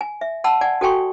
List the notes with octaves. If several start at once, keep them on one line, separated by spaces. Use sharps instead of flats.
G#5
E5
F#5 A5 B5 E6
D5 F#5 G#5
F#4 A4 G5 G#5 C6 C#6